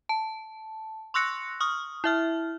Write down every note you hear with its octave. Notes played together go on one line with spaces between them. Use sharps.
A5
C6 C#6 E6 F#6 A#6 C#7
C#6 D#6 F6
E4 E5 F6